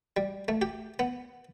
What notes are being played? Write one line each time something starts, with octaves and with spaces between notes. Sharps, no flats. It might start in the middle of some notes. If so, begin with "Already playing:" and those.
G3
A3
G4
B3